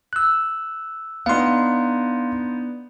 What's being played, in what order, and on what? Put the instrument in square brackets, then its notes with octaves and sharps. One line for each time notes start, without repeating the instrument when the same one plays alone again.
[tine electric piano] E6 F#6
[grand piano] B3 D4 D#4 [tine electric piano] F5 C6